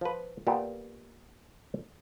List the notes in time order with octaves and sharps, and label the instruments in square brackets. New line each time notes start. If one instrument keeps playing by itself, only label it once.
[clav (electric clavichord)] F3 B4
A#2 B3 F4 G4 A4